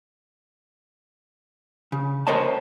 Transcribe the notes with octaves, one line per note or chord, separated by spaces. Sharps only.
C#3
A#4 C5 C#5 D#5 A5